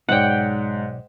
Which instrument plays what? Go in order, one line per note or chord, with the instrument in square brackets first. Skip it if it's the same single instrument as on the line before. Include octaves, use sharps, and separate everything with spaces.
[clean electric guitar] B1 C#5 D5 [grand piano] G#2 [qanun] F#5 G5